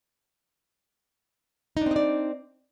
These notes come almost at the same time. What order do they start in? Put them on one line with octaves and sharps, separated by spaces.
D#4 D4 C4 D#5 D5